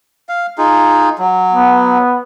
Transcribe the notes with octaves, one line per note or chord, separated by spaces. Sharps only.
F5
D#4 F4 G#4
F#3
B3